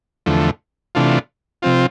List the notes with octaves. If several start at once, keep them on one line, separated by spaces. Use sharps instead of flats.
E2 D3 F3 A3
C3 E3 A3 D4 F4
C3 F3 C4 F4